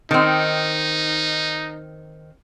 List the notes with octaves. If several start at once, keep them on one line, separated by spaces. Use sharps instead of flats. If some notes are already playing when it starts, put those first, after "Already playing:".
D#3 C4 D#4